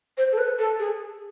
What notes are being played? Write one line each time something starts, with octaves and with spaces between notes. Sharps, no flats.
C5
A4
B4
A4
G#4